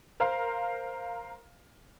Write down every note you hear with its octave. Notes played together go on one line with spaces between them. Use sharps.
A#4 C5 F5 A#5